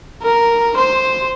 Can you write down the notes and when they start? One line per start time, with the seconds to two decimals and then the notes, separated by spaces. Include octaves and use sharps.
0.23 A#4
0.77 C5